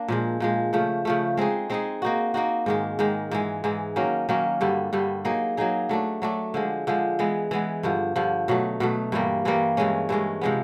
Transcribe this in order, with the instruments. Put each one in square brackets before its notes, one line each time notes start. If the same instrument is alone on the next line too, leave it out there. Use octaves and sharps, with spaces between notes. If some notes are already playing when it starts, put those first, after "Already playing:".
Already playing: [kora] A#3 D4
A#2 F3 G#3
A#2 F3 G#3
C#3 F3 A3
C#3 F3 A3
G#3 C4 D#4 G#4
G#3 C4 D#4 G#4
A#3 D#4 F#4
A#3 D#4 F#4
G#2 D#3 G#3
G#2 D#3 G#3
G#2 E3 G#3
G#2 E3 G#3
D#3 F#3 A#3 C#4
D#3 F#3 A#3 C#4
G2 D3 G3
G2 D3 G3
F#3 A#3 D#4 G#4
F#3 A#3 D#4 G#4
F#3 A3 D4
F#3 A3 D4
D3 F3 G#3
D3 F3 G#3
E3 G#3 B3
E3 G#3 B3
G2 D3 F3
G2 D3 F3
B2 F#3 A3
B2 F#3 A3
G2 E3 G3 A#3
G2 E3 G3 A#3
G2 E3 G#3 C#4
G2 E3 G#3 C#4
C3 F3 G#3 B3